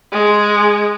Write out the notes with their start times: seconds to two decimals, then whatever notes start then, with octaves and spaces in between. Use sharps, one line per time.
0.12 G#3